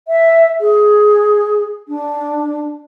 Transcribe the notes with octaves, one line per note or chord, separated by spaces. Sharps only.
E5
G#4
D4